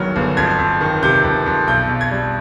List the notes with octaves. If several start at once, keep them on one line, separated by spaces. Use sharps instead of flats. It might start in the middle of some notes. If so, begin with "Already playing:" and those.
Already playing: G1 G2 D#3 F#3 F6
G1
F2 G#6
F2
D#3
C3 G6
F2
F2
B1 G6
B1
G#6
G3